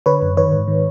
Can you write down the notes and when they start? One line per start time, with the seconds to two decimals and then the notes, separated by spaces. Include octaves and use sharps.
0.06 D3 B4 C#5
0.22 F#2
0.37 D#3 B4 C#5
0.52 G#2
0.68 D#3